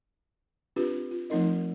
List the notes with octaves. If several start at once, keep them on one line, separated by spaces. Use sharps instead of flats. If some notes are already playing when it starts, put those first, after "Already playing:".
C4 D4 F4 G4 B4
F4
F3 A3 C4 D#4 A#4 D#5